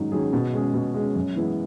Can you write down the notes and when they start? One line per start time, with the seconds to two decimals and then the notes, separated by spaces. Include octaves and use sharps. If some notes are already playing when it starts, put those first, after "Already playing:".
Already playing: G#2 D#3 F#3 C#4 G#4
0.12 D#3 F#3 C#4 G#4
0.33 B2
0.53 G#3 C#4 G#4
0.74 B2
0.94 G#3 C#4 G#4
1.15 F#2
1.36 E3 G#3 B3 E4